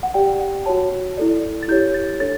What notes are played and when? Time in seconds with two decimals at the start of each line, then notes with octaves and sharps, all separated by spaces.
0.03 F#5
0.14 G4 D5 G5
0.40 F#5
0.66 F#4 C#5 A5
1.17 E4 A4 D5
1.63 A6
1.68 E4 G4 C#5 G6
1.94 A6
2.20 D4 A4 C#5 A6